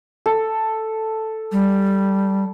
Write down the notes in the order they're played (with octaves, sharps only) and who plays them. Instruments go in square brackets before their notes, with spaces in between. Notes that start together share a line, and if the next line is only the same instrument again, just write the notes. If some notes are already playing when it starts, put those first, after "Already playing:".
[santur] A4
[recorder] G3